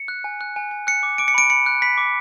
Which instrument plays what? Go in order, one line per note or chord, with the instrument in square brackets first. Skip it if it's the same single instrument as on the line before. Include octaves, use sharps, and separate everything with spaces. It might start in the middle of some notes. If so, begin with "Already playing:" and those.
Already playing: [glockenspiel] C#7
F#6
G#5
F#6
G#5
G#5
F#6 C#7
D6
D6 D7
C#7
B5 D7
B5 C#7
F#6
B5 B6
D6